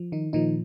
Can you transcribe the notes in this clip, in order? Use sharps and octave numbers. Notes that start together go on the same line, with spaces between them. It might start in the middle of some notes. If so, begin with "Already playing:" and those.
Already playing: F3
D#3 D#4
A#2 D#3 F3 D#4